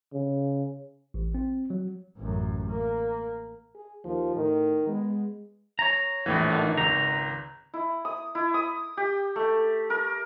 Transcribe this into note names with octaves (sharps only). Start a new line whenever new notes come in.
C#3
A1
C4
F#3
A1 F#2
A#3
G#4
D#2 F3
A2 D#3
G#3 B3
C#5 A#5
A#1 A2 E3
D3 D#3
G#1 C#2 A#5
E4
D#6
E4
D#6
G4
A3
A#4